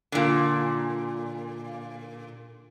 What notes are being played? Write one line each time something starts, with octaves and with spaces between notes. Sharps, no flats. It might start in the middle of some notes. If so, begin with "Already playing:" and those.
A#2 D3